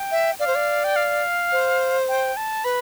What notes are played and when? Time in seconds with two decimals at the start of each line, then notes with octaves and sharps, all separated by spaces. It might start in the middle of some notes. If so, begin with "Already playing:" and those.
Already playing: G5
0.11 E5
0.39 D5 F5
0.47 C5
0.55 D5
0.84 G5
0.96 F5
1.52 C5
2.09 G5
2.37 A5
2.64 B4 B5